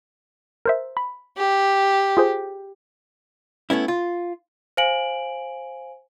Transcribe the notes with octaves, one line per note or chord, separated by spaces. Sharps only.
A#4 C5 E5
B5
G4
F4 G#4 C5
A3 B3 C#4 E4
F4
C5 F5 G#5 D7 F#7